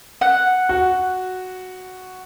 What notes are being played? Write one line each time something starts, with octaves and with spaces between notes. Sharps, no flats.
F#5
F#4